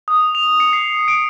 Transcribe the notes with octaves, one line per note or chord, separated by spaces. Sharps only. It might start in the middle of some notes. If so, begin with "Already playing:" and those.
D#6
F7
C#7
C7
D7